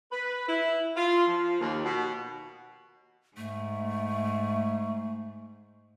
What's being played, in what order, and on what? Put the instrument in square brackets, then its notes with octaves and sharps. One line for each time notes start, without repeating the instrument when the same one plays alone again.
[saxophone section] B4
E4
F4
F3
D#2
B2
[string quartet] G#2 [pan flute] A3